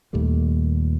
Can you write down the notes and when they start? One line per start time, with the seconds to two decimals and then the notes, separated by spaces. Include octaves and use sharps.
0.13 D#2 A#2 G3 A3